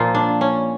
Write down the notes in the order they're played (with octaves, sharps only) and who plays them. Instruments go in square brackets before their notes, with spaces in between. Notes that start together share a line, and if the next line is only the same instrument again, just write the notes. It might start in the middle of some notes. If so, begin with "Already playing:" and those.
Already playing: [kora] A#2 F3 A#3 F4
D4
C#4